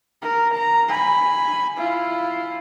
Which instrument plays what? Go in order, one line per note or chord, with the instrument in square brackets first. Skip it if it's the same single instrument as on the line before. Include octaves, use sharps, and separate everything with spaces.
[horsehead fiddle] A#4
A#5
G#5 B5
E4 F4